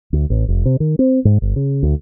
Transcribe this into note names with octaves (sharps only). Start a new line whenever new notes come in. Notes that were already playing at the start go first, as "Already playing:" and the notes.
D2
A1
F1
C3
D#3
C4
G#2
G1
C#3
D2